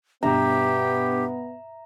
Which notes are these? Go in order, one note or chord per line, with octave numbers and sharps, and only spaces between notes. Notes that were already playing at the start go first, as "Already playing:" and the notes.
G2 B2 B3 G4 E5 A#5